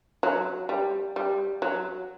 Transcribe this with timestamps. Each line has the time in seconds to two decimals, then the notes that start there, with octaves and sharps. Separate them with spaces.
0.23 F#3
0.69 G3
1.16 G3
1.62 F#3